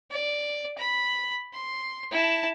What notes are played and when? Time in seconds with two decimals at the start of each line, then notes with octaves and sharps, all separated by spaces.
0.11 D5
0.78 B5
1.53 C6
2.11 E4 A5